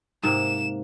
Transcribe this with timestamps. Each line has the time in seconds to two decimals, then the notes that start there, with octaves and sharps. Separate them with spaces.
0.23 G#2 C3 A#3 E7